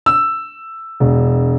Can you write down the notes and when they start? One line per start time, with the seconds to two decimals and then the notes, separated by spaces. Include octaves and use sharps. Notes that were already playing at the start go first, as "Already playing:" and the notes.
0.06 E6
1.00 E1